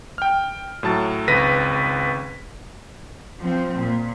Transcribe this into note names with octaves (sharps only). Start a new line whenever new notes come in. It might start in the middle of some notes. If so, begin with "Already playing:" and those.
G5 F6
A2 F#3 A5 A6
G#1 C#2 B4 A#6 B6 D#7
F3 C4
A#2